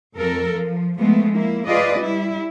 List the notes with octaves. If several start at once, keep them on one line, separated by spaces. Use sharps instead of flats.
F2 A4 A#4
F3
F3 G#3 A3 B3
A#3 E4
F4 G#4 B4 D5 D#5
G3 E4